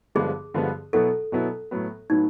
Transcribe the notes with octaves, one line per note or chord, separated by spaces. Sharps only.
G2 D3 F3 G#3 B3 G#4
G2 D3 F3 G#3 B3
B2 F#3 B3 E4 A4
B2 F#3 B3 E4
A2 F#3 B3
A2 F#3 B3 D#4